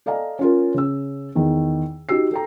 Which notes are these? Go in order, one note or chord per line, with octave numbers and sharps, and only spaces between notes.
A4 D5 D#5 F5 G#5 A#5
C#4 F4 A#4
C#3 E6
E2 D#3
D#4 F#4 G4 E6 C7
A4 G5 A#5